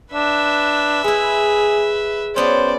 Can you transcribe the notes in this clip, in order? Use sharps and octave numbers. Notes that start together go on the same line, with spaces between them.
D4 B4 E5
G#3 E4 G#4
F#3 B3 C#4 C5 D5